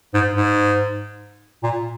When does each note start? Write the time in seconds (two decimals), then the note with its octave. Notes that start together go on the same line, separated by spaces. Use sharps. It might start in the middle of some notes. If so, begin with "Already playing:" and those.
0.14 G#2
0.35 G#2
1.63 A#2